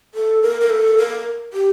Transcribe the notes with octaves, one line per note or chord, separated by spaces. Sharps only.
A4
A#4
A#4
A4
A#4
G4